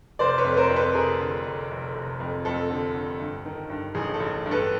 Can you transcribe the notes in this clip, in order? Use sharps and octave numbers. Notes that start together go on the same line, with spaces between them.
F1 C5 D5
B4 C#5
F2
A#4 C5
F2
A4 B4
F1 G#4 A#4
D3
F1
F1
F1
F2
F2 A4
D3
D3
G2
D#3
G2
A1 G#4
A4
A1
G2
A4 B4